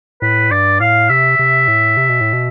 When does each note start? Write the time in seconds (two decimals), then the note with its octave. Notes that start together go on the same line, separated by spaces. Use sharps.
0.22 A2 B4
0.51 G2 D5
0.80 A2 F5
1.09 C3 E5
1.39 C3
1.68 A2
1.97 C3
2.09 B2
2.21 A2
2.33 B2